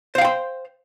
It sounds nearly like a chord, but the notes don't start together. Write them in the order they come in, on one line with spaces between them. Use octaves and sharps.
C5 F5 G5 C6